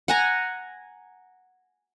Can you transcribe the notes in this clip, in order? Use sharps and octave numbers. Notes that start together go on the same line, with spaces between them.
F#5 G#5 A#5